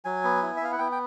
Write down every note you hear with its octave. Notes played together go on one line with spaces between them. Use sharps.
F#3 G#5
B3
E4
E5
B3 F5
F#5
B3 G5
G5